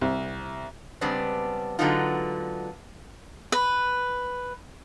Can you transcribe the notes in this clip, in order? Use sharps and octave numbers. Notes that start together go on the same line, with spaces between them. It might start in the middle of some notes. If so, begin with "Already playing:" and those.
C2
C#3 G3 G#3 B3 C4 D4
D3 F#3 G#3 B3 D#4 F4
B4